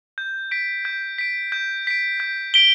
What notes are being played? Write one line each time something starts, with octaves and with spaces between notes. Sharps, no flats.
G6
B6 D7
G6
B6 D7
G6
B6 D7
G6
B6 D7 G7